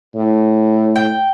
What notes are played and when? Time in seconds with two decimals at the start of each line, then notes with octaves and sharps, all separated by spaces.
0.15 A2
0.96 G5